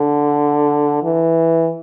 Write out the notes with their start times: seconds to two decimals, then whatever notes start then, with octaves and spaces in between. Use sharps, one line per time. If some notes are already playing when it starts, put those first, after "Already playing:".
Already playing: D3
1.03 E3